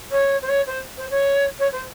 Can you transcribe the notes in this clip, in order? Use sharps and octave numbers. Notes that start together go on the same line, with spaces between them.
C#5
C5
C#5
C5
C5
C#5
C#5
C5